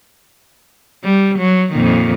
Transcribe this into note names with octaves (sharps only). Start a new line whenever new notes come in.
G3
F#3
F2 A#2 D#3